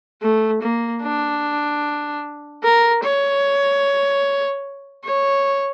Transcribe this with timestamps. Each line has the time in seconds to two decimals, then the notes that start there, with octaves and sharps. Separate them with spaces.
0.22 A3
0.62 A#3
1.03 D4
2.64 A#4
3.04 C#5
5.04 C#5